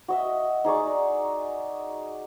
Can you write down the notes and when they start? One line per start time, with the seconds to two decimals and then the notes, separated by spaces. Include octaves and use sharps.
0.08 F#4 D#5 E5
0.64 D#4 G#4 D5 C#6